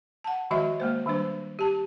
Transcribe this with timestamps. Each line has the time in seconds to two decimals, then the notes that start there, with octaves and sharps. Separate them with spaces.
0.24 F#5 A5
0.51 D#3 F3 G#3 F#4 D#5 E5
0.80 G#3 A#3 C5
1.06 D#3 G3 D4 C5
1.59 G4 A5